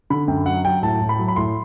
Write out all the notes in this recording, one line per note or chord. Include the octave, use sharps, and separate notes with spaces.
D3 B5
F#2 G5
F#3 F#5
F#3 G5
A2 A5
A2
B5
F#3
B5
A2 C6